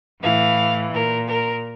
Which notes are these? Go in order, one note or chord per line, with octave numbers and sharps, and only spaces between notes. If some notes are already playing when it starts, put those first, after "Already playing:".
A2 E3 F5
A#2 A#4
A#4